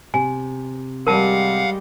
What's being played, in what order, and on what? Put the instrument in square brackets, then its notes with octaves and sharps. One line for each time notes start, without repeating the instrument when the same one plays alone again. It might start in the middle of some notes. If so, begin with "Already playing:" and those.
[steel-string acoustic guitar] C3 [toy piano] G#5
[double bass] G3 G#3 [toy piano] A#4 A5 [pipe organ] F5 F#5